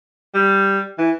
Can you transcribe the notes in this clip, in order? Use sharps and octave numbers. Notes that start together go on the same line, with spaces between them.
G3
E3